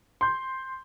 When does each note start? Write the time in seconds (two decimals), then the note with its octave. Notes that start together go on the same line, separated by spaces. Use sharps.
0.21 C6 G6